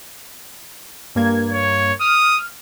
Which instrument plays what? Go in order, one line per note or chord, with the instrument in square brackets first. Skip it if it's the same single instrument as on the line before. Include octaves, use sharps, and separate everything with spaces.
[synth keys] G2 A#3 G#6
[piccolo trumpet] C#5
[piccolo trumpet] D#6 [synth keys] F6